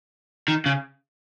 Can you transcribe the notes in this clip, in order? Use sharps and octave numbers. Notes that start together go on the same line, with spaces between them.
D#3
C#3